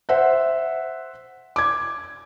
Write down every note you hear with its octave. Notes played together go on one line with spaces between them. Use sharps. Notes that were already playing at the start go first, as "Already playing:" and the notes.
C5 E5 F#5
D6 G#6